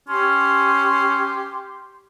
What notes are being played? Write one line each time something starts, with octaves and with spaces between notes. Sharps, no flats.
C#4 G4 C6